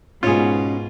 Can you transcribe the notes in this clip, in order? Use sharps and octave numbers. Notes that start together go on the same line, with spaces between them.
G#2 B2 C#4 F4 G#4 C#5